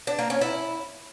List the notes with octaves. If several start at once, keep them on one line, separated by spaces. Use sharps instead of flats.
D4
A#3
C#4
E4